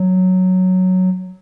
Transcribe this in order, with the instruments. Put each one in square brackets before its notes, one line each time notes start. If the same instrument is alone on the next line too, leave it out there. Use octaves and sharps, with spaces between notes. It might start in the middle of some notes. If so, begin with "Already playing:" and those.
Already playing: [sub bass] F#3